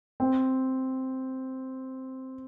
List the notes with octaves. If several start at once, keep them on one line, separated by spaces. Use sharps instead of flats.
C4